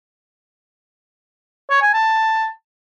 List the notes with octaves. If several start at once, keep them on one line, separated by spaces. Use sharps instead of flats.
C#5
G#5
A5